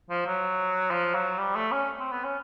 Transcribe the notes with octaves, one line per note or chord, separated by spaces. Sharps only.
F3
F#3
F3
F#3
G3
A3
C#4
C4
B3
C#4